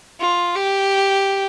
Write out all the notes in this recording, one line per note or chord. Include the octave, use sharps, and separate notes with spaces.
F4
G4